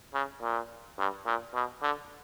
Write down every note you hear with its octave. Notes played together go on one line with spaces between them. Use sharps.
C#3
A#2
G2
A#2
B2
D3